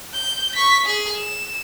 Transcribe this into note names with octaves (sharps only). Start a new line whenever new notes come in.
G6
C#6 B6
G#4
E7